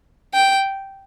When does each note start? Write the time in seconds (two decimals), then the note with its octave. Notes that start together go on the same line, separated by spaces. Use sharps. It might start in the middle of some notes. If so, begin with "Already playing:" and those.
0.34 G5